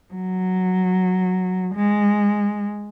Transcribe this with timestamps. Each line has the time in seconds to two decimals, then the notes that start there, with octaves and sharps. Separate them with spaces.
0.14 F#3
1.75 G#3